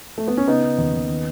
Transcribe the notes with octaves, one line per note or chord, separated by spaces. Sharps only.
A3
B3
C#4
C#3 B3 D#4
C#3
D#2
D#2
D#3